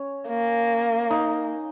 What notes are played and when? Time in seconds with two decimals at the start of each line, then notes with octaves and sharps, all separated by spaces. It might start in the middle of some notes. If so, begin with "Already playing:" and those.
Already playing: C#4
0.29 A#3
1.10 D#4